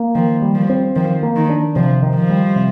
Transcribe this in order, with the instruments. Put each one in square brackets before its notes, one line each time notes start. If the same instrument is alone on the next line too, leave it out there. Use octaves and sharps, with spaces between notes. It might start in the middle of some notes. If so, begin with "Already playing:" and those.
Already playing: [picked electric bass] A#3
[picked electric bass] D#3 [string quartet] F3
[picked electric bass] G3
[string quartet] F3
[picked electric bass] C4
[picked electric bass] D#3 [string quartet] F3
[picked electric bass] A#3
[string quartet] D#3
[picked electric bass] D4
[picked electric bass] C3 [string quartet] F3
[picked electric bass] D#3
[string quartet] F3
[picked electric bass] G3
C3